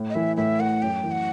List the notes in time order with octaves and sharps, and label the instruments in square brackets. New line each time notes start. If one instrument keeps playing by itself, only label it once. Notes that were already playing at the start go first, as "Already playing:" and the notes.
Already playing: [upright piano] A2
[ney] D#5
[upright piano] E3 [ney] E5
[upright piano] A2 [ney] E5
[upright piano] A3 [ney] F#5
[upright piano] F#2 [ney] G5
[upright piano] E3
[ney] F#5